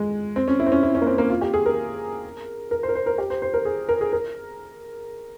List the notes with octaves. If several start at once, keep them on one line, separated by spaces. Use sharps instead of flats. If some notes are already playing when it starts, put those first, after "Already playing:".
Already playing: G#3
C4
C#4
E4
C4
C#4
E4
C#4
A#3
C4
A#3
F4
G4
G#4
A#4
A#4
C5
A#4
C5
A#4
G4
C5
C5
A#4
G#4
A#4
G#4
A#4